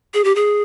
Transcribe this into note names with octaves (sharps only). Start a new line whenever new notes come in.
G#4
G4
G#4